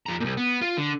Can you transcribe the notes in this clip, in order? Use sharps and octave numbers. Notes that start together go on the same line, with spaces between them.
F2 A#5
C2 A#2
B3
F4
D3